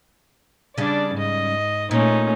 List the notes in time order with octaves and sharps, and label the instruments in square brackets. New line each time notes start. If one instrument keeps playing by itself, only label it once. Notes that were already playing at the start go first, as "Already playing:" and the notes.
[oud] C#3 G3 [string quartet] D4 D5
[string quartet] G#2 D#5
[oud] A#2 [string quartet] A3 C#4 D#4